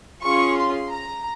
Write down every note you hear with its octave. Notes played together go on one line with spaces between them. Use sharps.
C#4 F4 G#4 C#6
C6
A#5